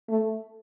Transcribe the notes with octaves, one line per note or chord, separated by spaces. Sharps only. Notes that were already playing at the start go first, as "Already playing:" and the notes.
A3